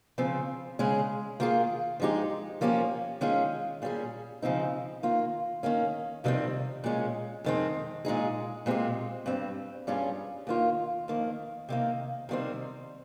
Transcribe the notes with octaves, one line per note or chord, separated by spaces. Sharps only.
C#3 F3 C4
C#3 G#3 C#4 G#4
D#3 A#3 F4 G#4
F3 G#3 D#4 G4
F3 A#3 C#4 G4
D#3 G#3 C#4 F4 G#4
A#2 G3 C#4 G#4
C#3 F3 C4 D#4
D#3 A#3 F4
D#3 A#3 C#4
F2 C3 D#3 G3 C4
A#2 G#3 C#4
F2 D#3 G#3 C4
A#2 G#3 D#4 G#4
A#2 G#3 C4 G4
G2 G3 C4
G2 G3 C#4 F4 G#4
D#2 D#3 A#3 F4
F2 D#3 A#3
C3 D#3 A#3
C3 D#3 G3 C4